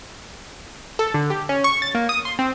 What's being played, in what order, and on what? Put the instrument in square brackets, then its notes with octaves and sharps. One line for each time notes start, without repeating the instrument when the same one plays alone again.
[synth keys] A4
D3
G4
C#4
C#6
A6
A#3
D#6
C6
C4